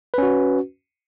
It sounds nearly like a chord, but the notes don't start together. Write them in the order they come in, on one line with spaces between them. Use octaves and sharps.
B4 C#4 F#4